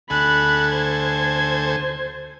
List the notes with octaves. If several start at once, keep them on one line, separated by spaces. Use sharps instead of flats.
D2 A4 G#5 B5 F#6
C5 G#6